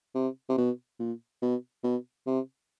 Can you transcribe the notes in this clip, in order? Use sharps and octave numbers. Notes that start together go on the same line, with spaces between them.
C3
C3
B2
A#2
B2
B2
C3